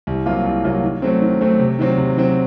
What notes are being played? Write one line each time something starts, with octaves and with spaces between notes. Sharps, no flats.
C2
C3 F#3 A#3 F4
C2
C3 F#3 A#3 F4
D#3
F#3 A3 C4
D#3
F#3 A3 C4
C3
D#3 F#3 C4
C3
D#3 F#3 C4